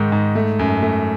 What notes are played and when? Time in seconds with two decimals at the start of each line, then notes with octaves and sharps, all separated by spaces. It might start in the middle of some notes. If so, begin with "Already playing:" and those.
Already playing: G#2 D#3 G#3
0.12 G#2
0.35 A3
0.59 F#2
0.82 A3